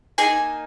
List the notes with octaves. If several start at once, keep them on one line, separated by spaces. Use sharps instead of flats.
A#3 D#4 G#4 G#5